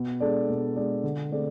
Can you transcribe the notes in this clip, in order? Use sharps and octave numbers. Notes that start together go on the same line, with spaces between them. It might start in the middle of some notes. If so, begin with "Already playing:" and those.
Already playing: B2
G#3 D4 A4 D5
B2
G#3 D4 A4 D5
D3
A3 C4 G#4 D5